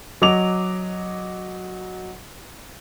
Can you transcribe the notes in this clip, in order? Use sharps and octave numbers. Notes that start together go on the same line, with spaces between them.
F#3 D#5 D6 F7